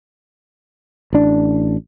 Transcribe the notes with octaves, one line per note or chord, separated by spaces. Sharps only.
A1 D4